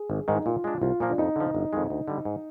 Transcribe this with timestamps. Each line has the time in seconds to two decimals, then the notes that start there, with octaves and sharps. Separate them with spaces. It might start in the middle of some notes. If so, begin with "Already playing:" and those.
Already playing: G#4
0.10 G#1
0.28 G#2 D#3 G#3
0.35 D#4
0.46 A#2 F4
0.64 G#3 D4
0.81 C2 F4
1.00 A#2 F3 A#3
1.09 D4
1.18 F2 D#4
1.36 D3 F3
1.55 G1
1.73 F2 D#3 G#3
1.90 D2
2.08 D3 G3
2.25 G#2